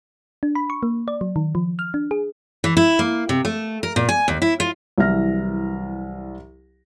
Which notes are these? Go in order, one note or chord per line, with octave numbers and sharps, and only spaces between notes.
D4
B5
C#6
A#3
D5
F#3
D#3
F3
F6
D4
G#4
E3
E4
A#3
C3
A3
A#4
A#2
G#5
D#2
E4
F4
C2 E3 F#3 E5 F6 A#6